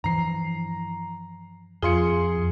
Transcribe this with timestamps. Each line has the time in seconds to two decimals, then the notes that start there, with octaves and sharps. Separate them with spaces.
0.04 G2 E3 F3 A#5 C7
1.83 F2 F3 F4 G#4 C6 C#7